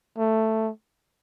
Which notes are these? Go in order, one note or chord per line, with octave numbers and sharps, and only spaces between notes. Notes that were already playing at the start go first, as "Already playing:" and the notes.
A3